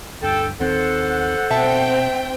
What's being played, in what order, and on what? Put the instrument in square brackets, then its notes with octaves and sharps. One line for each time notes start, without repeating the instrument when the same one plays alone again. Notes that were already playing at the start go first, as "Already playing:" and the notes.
[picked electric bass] D2 G2 [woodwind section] A4 G5
[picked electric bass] D#2 D#3 C4 [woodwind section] A4 C5 F#5
[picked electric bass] B2 [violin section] C4 G5 [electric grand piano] E5 A5